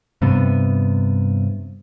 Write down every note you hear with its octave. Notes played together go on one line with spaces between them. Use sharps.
G2 C3 B3